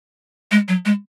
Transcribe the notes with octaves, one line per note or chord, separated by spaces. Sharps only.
G#3
F#3
G#3